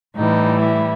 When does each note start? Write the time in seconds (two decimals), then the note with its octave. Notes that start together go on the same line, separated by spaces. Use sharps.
0.16 A2 E3 G3 D#4
0.61 E4